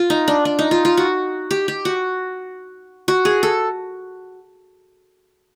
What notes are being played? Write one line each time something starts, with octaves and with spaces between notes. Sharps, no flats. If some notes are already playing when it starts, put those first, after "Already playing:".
Already playing: F4
D#4
D4
D4
D#4
F4
F4
F#4
G4
G4
F#4
F#4
G#4
A4